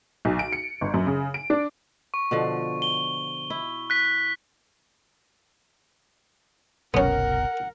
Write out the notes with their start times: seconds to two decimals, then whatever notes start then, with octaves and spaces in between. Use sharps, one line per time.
0.25 B1
0.39 D7
0.52 C#7
0.81 G1
0.94 F#2
1.07 C#3
1.34 D7
1.50 D4
2.14 C#6
2.31 B2 D3 F3
2.82 G7
3.50 E4
3.90 F#6 B6
6.94 F#1 C2 B2 B3 C#4 A#4 F#5